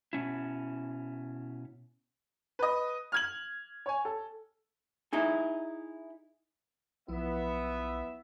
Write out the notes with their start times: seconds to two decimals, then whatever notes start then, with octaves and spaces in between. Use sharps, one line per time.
0.13 B2 C#4 E4
2.59 B4 D#5
3.12 F6 G#6 F#7
3.86 C#5 G#5
4.05 A4
5.13 D#4 E4 G#4
7.08 B1 F3 B3 E4 E5